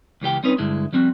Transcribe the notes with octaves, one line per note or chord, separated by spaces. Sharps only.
C#2 E3 G4 G5
G3 C4 C#4 D#4 B4
G2 D3 G#3 E4
F3 G3 C4 D4 F#4